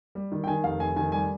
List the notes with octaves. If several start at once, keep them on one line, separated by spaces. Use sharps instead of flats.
G3
D#3
G5
D#3 G#5
F1 F5
F1 G#5
D#3 G#5
G3 G#5